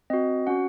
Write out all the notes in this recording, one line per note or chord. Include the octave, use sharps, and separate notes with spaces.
C4 F#4 D#5
C#4 F#4 F#5